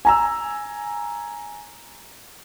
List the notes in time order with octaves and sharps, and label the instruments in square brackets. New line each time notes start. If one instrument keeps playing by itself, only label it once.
[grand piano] G#5 A#5 E6